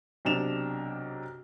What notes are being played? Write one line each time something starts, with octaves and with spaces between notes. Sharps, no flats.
B1 C3 D4 E7 F7